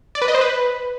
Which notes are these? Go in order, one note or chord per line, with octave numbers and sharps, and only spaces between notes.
D5
B4
D#5
C5
B4